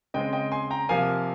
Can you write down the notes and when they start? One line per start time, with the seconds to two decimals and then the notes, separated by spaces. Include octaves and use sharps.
0.14 C#3 G#3 C4 D#5 G5
0.33 D#5 G5
0.52 G#5 C6
0.70 G5 A#5
0.89 C3 F3 A#3 F5 G#5